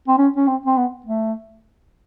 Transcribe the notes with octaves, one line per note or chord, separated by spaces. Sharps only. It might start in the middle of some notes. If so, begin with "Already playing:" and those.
C4
C#4
C#4
C4
C4
B3
A3